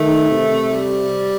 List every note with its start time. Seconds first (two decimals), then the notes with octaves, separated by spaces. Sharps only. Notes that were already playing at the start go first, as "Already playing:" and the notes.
Already playing: D#3 A3
0.31 C3
0.72 G3